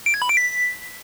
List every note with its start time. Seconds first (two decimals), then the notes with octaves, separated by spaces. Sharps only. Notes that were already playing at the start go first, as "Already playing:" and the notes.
0.06 D7
0.14 G#6
0.22 B5
0.29 D7
0.37 B6